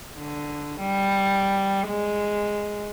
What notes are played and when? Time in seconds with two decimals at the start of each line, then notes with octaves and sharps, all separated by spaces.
0.17 D3
0.80 G3
1.88 G#3